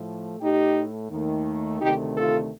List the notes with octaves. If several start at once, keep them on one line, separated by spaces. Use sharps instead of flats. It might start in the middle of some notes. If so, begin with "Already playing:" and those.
Already playing: A2 F3 A3
A2 A3 D#4 G4
D#2 D#3 A3
D2 C3 D#3 A3 D#4 G4
F4 A4